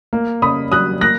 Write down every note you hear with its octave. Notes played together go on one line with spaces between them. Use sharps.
A#3
C#3 B5 D#6
F#3 D#6 F#6
A#3 F#6 A#6